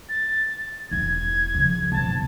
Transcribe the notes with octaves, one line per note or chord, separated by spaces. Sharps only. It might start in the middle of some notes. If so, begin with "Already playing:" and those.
A6
E1 E4 G#6
C#3 F3
B1 F#2 A5